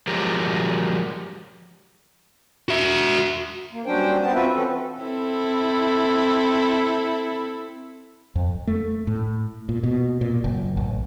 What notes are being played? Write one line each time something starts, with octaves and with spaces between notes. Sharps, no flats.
F3 F#3 G#3 G4 A#4
F#4 E5
A#3
G2 F#3 C#4 D4 C5 G5
B3 C4 A5
C4 F4 F#4 B4 E5
E3 C4 C#4 A4
C4 E4 A4
F2
A3
A2
A#2
B2
A#2
F#1
A1